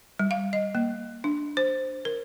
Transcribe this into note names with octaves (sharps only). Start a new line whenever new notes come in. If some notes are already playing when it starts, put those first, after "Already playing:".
G3
F5
D#5
A#3
D4
C5
A#4